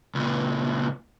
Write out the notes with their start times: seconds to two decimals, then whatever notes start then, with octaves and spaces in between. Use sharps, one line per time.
0.15 C#2 A#2